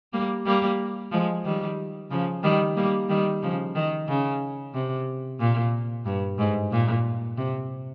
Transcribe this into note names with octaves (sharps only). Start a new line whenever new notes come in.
G3 A#3
G3 A#3
F3 G#3
D#3 G3
C#3 F3
D#3 G3
G3 A#3
D#3 G3
C#3 F3
D#3
C#3
C3
A#2
G2
G#2
A#2
C3